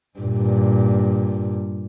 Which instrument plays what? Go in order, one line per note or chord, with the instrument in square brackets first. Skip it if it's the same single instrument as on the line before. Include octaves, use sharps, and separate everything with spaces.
[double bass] G2 A#2